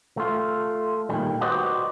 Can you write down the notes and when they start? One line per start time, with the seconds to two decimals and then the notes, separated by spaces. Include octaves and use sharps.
0.17 A3 F4
1.09 A#2 D#3 G3
1.41 F#4 B4 C5 D5 D#5 F#5